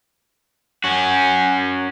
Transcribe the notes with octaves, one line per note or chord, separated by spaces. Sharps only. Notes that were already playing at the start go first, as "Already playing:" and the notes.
C#4 F#4